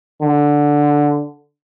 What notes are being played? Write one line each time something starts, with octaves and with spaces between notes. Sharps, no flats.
D3